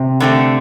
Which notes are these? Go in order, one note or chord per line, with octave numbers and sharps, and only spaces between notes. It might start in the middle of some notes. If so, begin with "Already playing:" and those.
Already playing: C3
D3 A3 C4